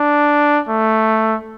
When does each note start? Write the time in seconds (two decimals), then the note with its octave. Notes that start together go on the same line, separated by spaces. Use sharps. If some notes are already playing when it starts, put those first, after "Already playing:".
Already playing: D4
0.68 A3